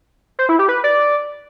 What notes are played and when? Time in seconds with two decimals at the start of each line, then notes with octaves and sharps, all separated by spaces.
0.39 C5
0.49 E4
0.59 G4
0.69 B4
0.84 D5